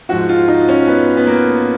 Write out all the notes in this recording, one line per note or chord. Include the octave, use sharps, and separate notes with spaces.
G#2 F3 F#4
F4
D#4
C#4
B3
B3
A#3